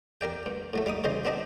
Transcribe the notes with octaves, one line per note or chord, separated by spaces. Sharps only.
G4 A#4 D5 G5
G2
A2 F#3 A3
G3 D#4 D6 D#6
C#3 E3 G3 C5 D#5
B3 C4 D4 G4 D#5